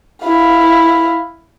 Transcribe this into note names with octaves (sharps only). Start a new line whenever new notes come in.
E4 F5